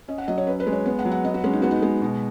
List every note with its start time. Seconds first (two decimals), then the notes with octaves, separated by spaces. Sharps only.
0.08 C#4 D#5
0.18 F#5
0.28 F#3 D#5
0.38 C#5
0.47 C#4 B4
0.60 B4
0.67 G#3
0.73 C#5
0.86 B3
0.99 F#5
1.05 F#3
1.12 F#5
1.24 B3 D#5
1.34 F#4
1.44 G#3 C#4
1.53 D#4
1.62 B3 F#4
1.71 D#4
1.82 G#3
2.02 B2